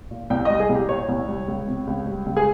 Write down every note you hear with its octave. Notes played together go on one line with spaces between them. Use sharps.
A#2
C2 G5
G3 D#5
G#4
C2
G4
A#2 C#5
C2
G3
C#2
C3
C#2
G3
C#2
G#4